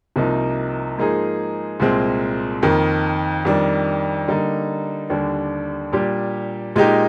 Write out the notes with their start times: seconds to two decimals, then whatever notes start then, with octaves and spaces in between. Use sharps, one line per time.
0.16 C2 C3 F3 A#3 D#4
0.98 G#2 F3 A#3 D#4 G#4
1.80 C2 A#2 G#3 C4
2.62 F2 D#3 A#3
3.45 F2 D#3 G3 D4
4.28 D3 G3 A#3 D#4
5.10 D#2 D3 G3 D4
5.93 A#2 G3 D4 G4
6.76 A#2 G#3 D#4 G4